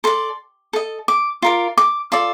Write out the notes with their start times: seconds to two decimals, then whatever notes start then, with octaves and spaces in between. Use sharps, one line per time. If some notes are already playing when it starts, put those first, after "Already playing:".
0.04 A4 D5 C6
0.73 A4 D#5
1.08 D6
1.42 F4 A#4 D5
1.78 D6
2.12 F4 A4 D5